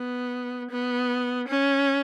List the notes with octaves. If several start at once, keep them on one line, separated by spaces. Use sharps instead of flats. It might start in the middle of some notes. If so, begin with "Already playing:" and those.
Already playing: B3
B3
C#4